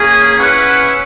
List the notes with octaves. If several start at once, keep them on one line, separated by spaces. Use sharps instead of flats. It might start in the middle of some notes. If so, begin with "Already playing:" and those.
Already playing: A#3 C#4 G#4
C#4 E4 B4 F#5